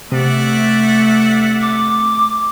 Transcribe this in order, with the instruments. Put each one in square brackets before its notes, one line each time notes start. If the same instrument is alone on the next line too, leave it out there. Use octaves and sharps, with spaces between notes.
[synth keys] C3 [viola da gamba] A3 [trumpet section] D5 E5 F#5
[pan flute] D6